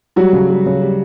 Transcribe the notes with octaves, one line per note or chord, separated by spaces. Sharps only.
F#3 G3 F#4
C#3
G3
C#3
G3